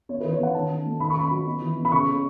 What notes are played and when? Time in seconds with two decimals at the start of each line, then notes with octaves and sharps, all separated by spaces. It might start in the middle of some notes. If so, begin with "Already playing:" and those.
0.09 B3 C#5
0.21 E3 B4
0.32 C#5
0.40 B3 F#5
0.55 D#3 A5
0.70 C#4
0.86 A3
1.00 D#3 B5
1.10 C#6
1.16 C#4 B5
1.31 F#3
1.47 B3
1.62 E3
1.77 B3
1.85 B5
1.92 C#3 C#6
2.08 C#4